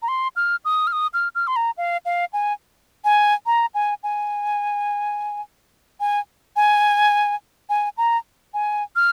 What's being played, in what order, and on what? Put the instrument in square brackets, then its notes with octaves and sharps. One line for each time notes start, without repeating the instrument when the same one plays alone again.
[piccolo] A#5
C6
F6
D#6
F6
D#6
F6
F6
C6
A#5
F5
F5
G#5
G#5
A#5
G#5
G#5
G#5
G#5
G#5
A#5
G#5
F6